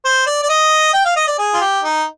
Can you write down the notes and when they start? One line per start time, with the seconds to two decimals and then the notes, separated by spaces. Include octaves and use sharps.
0.05 C5
0.27 D5
0.43 D5
0.49 D#5
0.94 G5
1.05 F5
1.16 D#5
1.28 D5
1.38 G#4
1.53 F4
1.61 G4
1.83 D#4